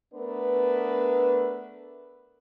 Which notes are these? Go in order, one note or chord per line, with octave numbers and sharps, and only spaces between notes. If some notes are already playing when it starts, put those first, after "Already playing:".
A3 B3 D4 A#4 B4